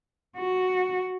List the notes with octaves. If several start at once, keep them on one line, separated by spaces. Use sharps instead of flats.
F#4